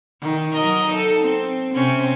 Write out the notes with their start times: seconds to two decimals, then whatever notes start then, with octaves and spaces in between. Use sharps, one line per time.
0.22 D#3
0.54 F#3 A#4 D#5
0.88 D#4 A4
1.21 C4
1.74 C3 C4 C#4